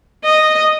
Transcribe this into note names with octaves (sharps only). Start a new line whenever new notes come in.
D#5